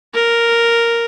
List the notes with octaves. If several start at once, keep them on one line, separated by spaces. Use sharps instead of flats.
A#4